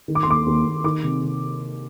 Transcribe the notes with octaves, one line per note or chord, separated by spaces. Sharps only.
D#3
D6
C6
D#2 D6
D#2
D#2
D#3 D6
C3
C3